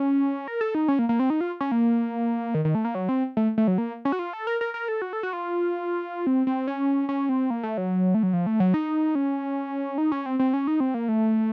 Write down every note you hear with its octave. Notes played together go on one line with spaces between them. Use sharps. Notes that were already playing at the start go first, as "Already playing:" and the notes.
Already playing: C#4
A#4
A4
D#4
C#4
A#3
A#3
C4
D#4
F4
C#4
A#3
D#3
D#3
A3
A#3
F#3
C4
A3
A3
F#3
A#3
C#4
F#4
F4
A4
A#4
A#4
A#4
A4
F#4
A4
F#4
F4
C4
C4
C#4
C#4
C4
A#3
A3
F#3
A3
F#3
F3
A3
F#3
D#4
C#4
D#4
C#4
C4
C4
C#4
D#4
C4
A#3
A3